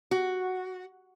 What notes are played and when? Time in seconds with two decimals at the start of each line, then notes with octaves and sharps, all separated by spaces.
0.11 F#4